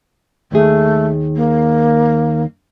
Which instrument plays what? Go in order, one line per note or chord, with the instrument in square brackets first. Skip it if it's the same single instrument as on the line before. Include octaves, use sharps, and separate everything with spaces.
[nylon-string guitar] D#2 D#3 G#4 [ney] A3
[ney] A#3